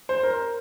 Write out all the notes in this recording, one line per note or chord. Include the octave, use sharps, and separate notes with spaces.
C5
A#4